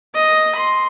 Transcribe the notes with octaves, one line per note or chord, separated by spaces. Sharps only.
D#5
C6